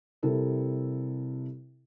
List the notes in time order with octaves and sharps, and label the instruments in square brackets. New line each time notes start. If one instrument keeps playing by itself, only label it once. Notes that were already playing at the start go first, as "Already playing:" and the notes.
[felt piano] C3 G3 E4 A4 A#4